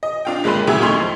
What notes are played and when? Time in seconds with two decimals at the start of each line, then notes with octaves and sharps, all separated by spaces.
0.03 D#5
0.25 D4 F4 G5
0.44 G1 G#3 A#3 B5 C6 D#7
0.67 D2 C#3 F#3 E4 G4 G#6
0.82 D#2 A3 D#4 C6 C#6 F7
1.00 F3